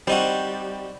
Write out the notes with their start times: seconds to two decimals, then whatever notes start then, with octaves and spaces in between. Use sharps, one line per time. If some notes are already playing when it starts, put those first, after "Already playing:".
0.07 G3 C4 D#4 F#4